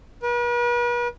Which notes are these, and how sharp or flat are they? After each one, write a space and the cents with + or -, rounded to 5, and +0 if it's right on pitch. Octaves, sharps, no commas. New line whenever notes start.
B4 -45